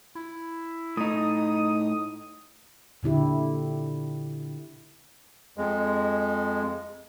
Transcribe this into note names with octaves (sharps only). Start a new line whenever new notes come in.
E4
A2 D#4 D#6
A#2 D3 E4 G4
F2 G#3